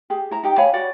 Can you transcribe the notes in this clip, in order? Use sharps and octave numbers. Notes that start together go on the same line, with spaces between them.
G4 G#4
E4 A#5
D#4 G4 G5
C#5 F5 G#5 B5
F#4 C#5 D5 F#5